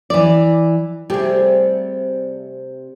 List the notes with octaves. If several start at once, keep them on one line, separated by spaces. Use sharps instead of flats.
E3 D5
C3 G3 A3 G4 G#4